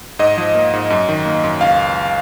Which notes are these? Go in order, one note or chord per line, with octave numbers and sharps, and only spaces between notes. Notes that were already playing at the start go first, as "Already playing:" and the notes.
G#2 D#5
F3
A#3
G#2
F#2
D#3
A#3
F#2
C#2 F5